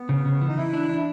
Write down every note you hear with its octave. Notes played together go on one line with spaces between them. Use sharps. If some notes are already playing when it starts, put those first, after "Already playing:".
Already playing: B3
C#3
C#3
E3
D#4
E3 E4
D4
D4